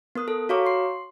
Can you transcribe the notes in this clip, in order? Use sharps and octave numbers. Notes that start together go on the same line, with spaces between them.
B3 A#4 D#6 F#6
A4
F#4 C#5 F5 A#5 C#6 D6
C6 C7